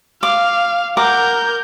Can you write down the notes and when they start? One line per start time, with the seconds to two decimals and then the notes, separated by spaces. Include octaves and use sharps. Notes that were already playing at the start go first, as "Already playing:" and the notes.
0.23 F5 D6
0.97 A#4 F#5 A#5 D6 G6